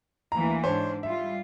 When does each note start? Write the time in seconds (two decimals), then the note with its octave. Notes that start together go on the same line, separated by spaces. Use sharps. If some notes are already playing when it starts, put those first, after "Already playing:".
0.32 D2 E3 A#3 A#5
0.64 G#2 D4 C5 C#5 A5
1.03 G3 F4 E5